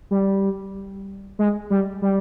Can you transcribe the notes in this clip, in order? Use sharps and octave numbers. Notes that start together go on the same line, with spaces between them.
G3
G#3
G3
G3